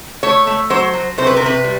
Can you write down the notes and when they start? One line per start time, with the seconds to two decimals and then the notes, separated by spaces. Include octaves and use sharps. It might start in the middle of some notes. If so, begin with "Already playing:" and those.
0.23 A3 C#5
0.47 A3
0.70 F#3 C5
0.93 F#3
1.18 C3 C5
1.27 B4
1.37 A#4
1.41 C3 B4
1.64 G3